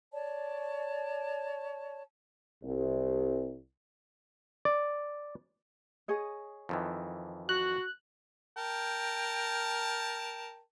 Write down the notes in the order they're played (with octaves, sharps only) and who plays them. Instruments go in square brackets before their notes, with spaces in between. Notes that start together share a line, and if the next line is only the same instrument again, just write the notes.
[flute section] C#5 D5 A5
[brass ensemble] C2
[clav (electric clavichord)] D5
[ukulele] G#4 C#5 D#5
[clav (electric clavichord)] F2 D#3 E3
[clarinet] F#4 [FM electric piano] F#6
[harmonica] A#4 G5 A5